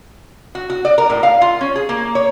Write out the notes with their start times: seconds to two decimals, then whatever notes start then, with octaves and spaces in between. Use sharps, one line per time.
0.55 F#4
0.70 F#4
0.85 D5
0.98 A#4
1.10 A2
1.23 F5
1.41 F4
1.61 C#4
1.75 G#4
1.89 A#3
2.15 C#5